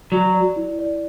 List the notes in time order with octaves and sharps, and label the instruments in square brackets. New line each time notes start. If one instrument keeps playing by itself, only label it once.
[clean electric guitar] F#3 [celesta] D5
[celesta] D5
E4
D5